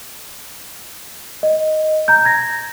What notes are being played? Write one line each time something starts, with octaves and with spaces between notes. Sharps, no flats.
D#5
A#5 G6
G#6 A#6